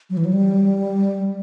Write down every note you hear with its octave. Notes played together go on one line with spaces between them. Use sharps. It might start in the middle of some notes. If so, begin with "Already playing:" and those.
F#3
E3
F#3
G3